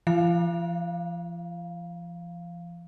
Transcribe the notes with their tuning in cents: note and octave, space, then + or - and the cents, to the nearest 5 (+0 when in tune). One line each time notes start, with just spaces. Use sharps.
F3 -40 F5 +0